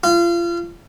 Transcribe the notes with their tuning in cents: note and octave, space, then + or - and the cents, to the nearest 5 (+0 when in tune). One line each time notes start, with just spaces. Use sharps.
F4 -30